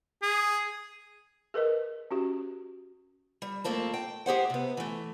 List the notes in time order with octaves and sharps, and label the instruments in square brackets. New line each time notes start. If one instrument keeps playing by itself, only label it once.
[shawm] G#4
[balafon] G#4 A#4 B4 D#5
C#4 F#4 G4
[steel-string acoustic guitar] G3
F2 A3 A#3 C4 A5
G5
G4 G#4 C5 F#5
C3 B3
E3 A3